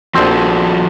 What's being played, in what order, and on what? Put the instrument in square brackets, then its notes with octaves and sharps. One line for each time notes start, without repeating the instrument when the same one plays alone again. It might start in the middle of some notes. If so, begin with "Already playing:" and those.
[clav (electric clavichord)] A#1 C4 [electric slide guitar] F3 F#4 A4